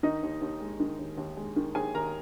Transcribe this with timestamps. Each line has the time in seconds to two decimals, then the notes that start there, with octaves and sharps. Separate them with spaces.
0.03 D#3 D#4 D#5
0.23 D#2
0.42 D#2
0.61 G#3
0.80 D#3
0.99 D#2
1.18 D#2
1.37 G#3
1.56 D#3
1.75 D#2 G#4 G#5
1.94 D#2 A#4 A#5